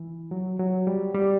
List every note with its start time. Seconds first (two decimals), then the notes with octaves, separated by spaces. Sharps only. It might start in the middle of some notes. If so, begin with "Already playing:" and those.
Already playing: E3
0.31 F#3
0.60 F#3
0.87 G3
1.14 G3